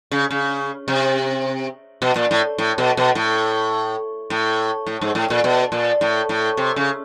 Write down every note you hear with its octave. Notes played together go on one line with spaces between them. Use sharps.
C#3
C#3
C3
B2
A#2
A2
A2
B2
B2
A2
A2
A2
G#2
A2
A#2
B2
A#2
A2
A2
C3
C#3